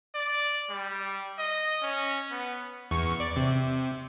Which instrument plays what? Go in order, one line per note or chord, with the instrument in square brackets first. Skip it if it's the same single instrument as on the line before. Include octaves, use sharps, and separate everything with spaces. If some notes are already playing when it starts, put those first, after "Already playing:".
[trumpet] D5
G3
D#5
C#4
B3
[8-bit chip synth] E2 C#6
D5
C3